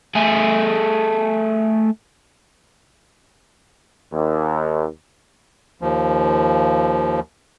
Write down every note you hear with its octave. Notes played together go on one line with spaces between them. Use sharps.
A3 G#4
D#2
D#2 F3